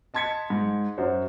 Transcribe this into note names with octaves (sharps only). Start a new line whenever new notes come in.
D#5 A5 C6 G#6 B6 C#7
G#2
F#2 C5 F#5